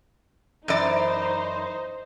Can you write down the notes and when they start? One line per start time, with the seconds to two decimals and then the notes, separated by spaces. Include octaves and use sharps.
0.68 F#2 E3 D#4 C5 D5